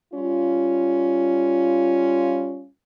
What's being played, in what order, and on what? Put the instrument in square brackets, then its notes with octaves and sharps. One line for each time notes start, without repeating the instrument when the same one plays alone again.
[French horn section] G3 C#4 F4